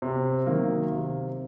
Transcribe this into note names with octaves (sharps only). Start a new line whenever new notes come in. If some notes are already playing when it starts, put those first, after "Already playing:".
C3
D#3 F#3 A#3
C3